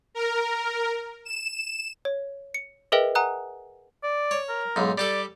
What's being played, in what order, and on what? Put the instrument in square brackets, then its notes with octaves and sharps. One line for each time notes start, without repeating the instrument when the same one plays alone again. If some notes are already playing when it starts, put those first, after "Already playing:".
[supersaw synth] A#4
E7
[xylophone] C#5
C#7
G#4 A#4 B4 D#5 E5 G5
F#5 G#5 A#5 D#6 F#6
[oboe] D5
[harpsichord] C#5
[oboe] A#4
[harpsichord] B1 G#2
[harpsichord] G3 G4 A4 [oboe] D5